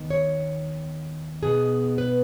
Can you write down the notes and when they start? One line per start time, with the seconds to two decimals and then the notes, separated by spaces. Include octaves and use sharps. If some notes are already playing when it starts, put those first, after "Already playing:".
Already playing: D#2 D#3 B3
0.10 C#5
1.43 B2 B3 D#4 G#4
1.98 B4